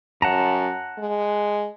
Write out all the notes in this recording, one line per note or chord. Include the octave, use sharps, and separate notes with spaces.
F#2 F#5 A5 A#5
G#3